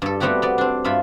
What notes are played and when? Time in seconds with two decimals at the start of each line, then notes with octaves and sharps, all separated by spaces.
0.02 G2 A4
0.20 G3 A3 B3 C4 F#4 G4
0.42 B3 D5
0.58 C4 D4
0.84 G2 F4 E5 B5